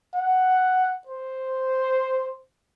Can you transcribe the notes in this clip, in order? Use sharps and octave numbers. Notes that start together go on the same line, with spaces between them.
F#5
C5